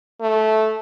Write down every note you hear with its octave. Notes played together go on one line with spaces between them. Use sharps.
A3